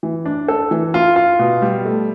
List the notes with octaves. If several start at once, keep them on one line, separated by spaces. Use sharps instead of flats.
E3
D4
A4
E3
F4
F4
B2
G3
A3